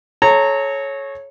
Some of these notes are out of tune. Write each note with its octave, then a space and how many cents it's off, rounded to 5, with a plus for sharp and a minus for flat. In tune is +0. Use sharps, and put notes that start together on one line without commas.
A4 -40 C#5 -10 A#5 -20